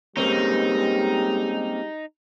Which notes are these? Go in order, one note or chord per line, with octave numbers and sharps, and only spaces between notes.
G3 G#3 A#3 C4 C#4 D#4 G4